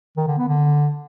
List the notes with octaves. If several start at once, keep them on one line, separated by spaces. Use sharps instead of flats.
D#3
D3
B3
D3